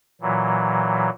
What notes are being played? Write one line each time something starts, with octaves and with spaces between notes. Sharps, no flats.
A#2 E3 F#3